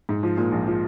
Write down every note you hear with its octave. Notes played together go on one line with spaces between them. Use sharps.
G#2
F3
A#2
A#1
F3